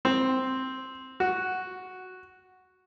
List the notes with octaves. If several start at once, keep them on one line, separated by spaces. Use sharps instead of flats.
C4
F#4